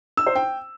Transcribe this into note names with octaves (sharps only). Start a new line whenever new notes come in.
E6
C5
G5